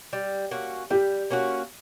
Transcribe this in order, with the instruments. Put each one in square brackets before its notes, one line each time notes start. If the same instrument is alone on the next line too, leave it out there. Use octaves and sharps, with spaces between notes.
[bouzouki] G3
A#3 C#4 F#4
[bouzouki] G3 [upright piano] G4
[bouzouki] A#3 C#4 F#4